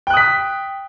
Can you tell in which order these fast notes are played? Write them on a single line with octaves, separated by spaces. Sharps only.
G5 F#6 D#6 B6